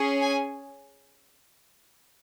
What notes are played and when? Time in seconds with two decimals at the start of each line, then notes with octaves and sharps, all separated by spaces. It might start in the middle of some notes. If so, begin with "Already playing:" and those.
Already playing: C#4 G#4
0.21 G#5